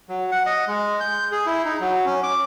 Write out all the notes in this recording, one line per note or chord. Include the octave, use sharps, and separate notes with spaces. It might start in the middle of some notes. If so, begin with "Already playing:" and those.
F#3
F#5
D#5
G#3
G6
G#4
E4
D#4
F#3
C#4
D6